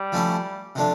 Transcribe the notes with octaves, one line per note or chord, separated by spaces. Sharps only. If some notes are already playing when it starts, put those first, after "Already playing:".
Already playing: G3
F3 A3 C#4 E4
C3 F3 A3 D4